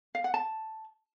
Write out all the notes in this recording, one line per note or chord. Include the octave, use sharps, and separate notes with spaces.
F5
F#5
A5